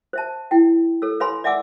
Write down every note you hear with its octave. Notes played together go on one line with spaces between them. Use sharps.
C5 E5 A5
E4 G5
A4 C#5 E6
B4 C#5 F5 G#5 B5 C6
D5 E5 F#5 G#5 D6 E6